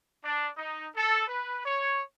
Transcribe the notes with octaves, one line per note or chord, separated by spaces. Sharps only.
D4
D#4
A4
B4
C#5